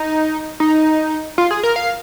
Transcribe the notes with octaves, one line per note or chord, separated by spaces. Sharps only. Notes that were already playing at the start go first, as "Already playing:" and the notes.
Already playing: D#4
D#4
F4
G#4
A#4
F5